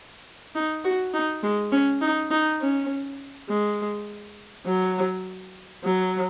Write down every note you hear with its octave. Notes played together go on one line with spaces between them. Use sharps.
D#4
F#4
D#4
G#3
C#4
D#4
D#4
C#4
G#3
F#3
F#3